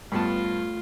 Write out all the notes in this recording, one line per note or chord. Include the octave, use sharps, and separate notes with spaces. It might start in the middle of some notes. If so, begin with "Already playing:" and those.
G2 A3 B3 F4 C#5 A5 B5